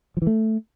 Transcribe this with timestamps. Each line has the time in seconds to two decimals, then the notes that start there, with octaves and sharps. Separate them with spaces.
0.17 F3
0.22 E3
0.27 A3